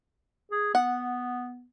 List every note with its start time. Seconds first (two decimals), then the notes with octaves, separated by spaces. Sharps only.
0.51 G#4
0.75 B3 F#5